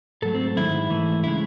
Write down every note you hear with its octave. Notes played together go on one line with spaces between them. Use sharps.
G#2 F#3 A3 A4
C4
G#2 D#3 G#3 E4
G#2 E3 A3
C#3 G#3 E4